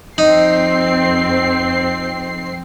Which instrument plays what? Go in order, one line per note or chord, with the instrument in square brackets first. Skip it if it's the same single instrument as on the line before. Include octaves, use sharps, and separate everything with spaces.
[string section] F2 C4 C7 [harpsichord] D#4